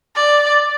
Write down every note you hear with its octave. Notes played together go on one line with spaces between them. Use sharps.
D5